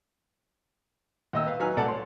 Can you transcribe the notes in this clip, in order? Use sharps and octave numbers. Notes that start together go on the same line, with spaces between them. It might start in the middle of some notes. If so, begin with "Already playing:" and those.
D#2 A#3 D#5 E5 E6
B4 F5
F#3 D#4 B4 G#5 F6
C2 A3 D5 F#5 A5
C#5 C6